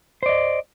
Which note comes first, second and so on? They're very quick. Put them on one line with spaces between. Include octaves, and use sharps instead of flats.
C5 D5 D#5